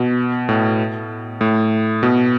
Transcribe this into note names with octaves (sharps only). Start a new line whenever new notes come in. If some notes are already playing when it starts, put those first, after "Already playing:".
Already playing: B2
A2
A2
B2